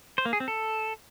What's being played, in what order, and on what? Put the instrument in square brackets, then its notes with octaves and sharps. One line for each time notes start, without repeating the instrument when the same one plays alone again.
[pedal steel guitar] C5
A#3
G#4
C4
A4